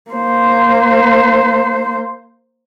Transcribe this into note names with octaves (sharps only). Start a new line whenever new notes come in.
A#3 C5